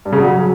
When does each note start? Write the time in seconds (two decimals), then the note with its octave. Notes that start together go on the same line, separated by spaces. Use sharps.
0.05 G2
0.12 C#3
0.20 F#3